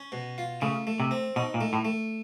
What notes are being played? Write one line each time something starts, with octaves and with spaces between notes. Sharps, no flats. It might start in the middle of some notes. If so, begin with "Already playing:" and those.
Already playing: C#4
B2
F4
C#3 A3
A3
C3
C4
B2 D#4
A#2
A3
A2
A3